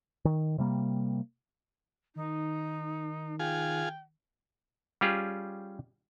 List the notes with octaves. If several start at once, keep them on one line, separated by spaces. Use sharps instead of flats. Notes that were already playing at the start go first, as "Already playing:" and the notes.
D#3
C3 G3 A#3
D#3 D#4
F4 G#4 G5
G3 C#4 F4 G4 G#4